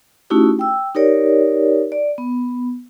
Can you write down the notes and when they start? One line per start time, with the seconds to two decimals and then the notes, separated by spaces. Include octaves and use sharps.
0.30 A3 C#4 D#4 E4 F#4 G4
0.59 G5 E6
0.95 D#4 G4 A#4 C#5 D5
1.92 D5
2.18 B3